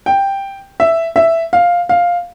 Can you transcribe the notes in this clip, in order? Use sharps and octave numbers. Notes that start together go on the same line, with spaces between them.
G5
E5
E5
F5
F5